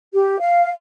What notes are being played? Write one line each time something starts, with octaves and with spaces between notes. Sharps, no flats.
G4
F5